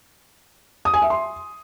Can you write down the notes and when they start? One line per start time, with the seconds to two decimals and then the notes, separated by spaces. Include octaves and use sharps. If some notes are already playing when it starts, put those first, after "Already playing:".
0.85 D#6
0.94 G#5
1.02 E5
1.10 C6